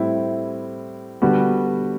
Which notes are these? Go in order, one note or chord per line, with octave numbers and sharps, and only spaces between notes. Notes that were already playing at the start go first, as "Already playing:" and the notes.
Already playing: A2 G3 C4 E4
D3 G3 B3 F#4